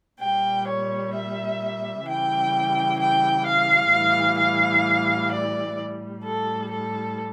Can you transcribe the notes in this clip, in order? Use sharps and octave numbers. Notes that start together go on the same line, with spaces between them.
A#2 G3 G5
C#5
E5
C#3 E3 G3 G5
G5
F5
A2 E3 G3
F5
D5
A2 G3
A4
A4